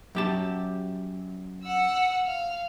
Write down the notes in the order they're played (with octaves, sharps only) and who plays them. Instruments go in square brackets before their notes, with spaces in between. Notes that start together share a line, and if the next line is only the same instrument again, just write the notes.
[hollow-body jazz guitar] F#2 G4 A5
[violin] F#5 E6
F5